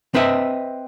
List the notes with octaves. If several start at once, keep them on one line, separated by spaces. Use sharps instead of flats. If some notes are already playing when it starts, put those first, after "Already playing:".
C4 B4 D#5 E5